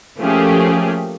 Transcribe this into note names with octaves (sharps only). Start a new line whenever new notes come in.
F3 A3 A#3 C#4 G4 G#4